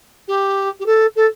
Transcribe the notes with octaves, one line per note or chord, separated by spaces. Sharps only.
G4
G4
A4
A4